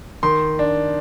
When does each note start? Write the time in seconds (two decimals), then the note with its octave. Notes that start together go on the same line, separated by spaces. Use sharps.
0.23 D#3 C6
0.59 D4